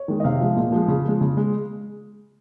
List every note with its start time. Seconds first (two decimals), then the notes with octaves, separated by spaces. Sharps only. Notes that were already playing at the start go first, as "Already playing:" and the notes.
Already playing: C#5
0.08 D#3 G#3
0.20 D#5
0.24 C3 F5
0.40 F3 G#3
0.57 A#2
0.72 F3 G#3
0.88 C#3
1.05 F3 G#3
1.21 C#3
1.37 G#3